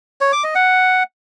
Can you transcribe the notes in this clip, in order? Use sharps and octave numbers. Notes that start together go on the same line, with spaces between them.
C#5
D6
D#5
F#5